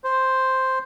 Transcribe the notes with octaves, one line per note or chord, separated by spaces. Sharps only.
C5